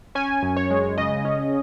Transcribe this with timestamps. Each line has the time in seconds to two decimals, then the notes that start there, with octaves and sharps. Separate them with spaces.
0.15 C#4 G#5
0.43 F#2
0.57 C#5
0.71 G#3
0.98 C#3 D#5
1.25 C#4